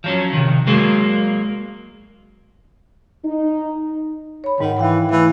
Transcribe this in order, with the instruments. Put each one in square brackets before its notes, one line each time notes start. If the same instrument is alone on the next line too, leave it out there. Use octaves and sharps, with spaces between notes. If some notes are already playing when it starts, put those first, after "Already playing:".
[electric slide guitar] F3 F#3 C#4
C3 D#3
F#3 G#3 A#3 F#4 G#4
[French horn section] D#4
[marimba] C#5 B5
[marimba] G#2 F#5 [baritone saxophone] D#3
[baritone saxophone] E3 [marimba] F5 G5
[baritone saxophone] E3 [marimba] A3